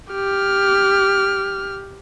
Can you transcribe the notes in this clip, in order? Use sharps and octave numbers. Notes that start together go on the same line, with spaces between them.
G4 F6